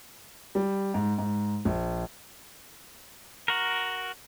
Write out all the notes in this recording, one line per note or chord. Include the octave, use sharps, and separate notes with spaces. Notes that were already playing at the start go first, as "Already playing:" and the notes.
G3
G#2
G#2
A#1
F#4 A#4